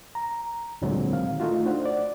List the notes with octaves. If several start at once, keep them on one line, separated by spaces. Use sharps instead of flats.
A#5
D2 A#2 D3 F#3 G#3 C4
D#3 F5
A3 D#4 F4 F#4
D4 C5 F#5
D5